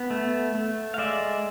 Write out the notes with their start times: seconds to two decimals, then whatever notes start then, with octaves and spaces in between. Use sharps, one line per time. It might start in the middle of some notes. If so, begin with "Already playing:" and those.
Already playing: B3
0.10 A3
0.55 A3
0.94 F5
0.98 G#3 D5 E5